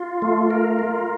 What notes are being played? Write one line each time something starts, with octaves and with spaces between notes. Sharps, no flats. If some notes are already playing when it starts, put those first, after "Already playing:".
Already playing: F4
A3
A#4
F4